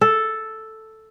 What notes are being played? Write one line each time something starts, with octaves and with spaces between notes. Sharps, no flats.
A4